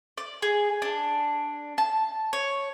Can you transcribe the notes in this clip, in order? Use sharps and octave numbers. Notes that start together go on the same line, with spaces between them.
D5
G#4
D4
A5
C#5